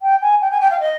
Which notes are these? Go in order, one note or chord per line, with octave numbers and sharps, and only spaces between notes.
G5
G#5
G5
G#5
G5
F5
D#5